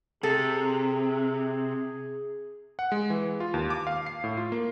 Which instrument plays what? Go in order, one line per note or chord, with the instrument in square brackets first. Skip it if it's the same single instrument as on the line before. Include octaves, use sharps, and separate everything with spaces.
[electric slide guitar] C3 [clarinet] G#4 [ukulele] A4
[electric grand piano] F#5
G#3
E3
F4
D#2
D6
F5
C7
A2
F4
A#3